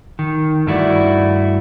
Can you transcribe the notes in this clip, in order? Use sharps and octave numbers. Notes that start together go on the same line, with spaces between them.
D#3
G2 A3 E4 F#4 D5